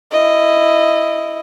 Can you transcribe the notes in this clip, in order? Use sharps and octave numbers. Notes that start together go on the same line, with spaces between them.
E4 D#5